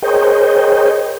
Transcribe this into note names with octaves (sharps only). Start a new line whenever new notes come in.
G#4 A#4 C5 C#5 D#5 G5